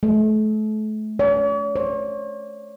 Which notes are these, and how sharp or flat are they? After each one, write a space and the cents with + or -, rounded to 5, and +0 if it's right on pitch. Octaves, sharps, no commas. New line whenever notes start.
A3 -35
C#5 +45
C#5 -45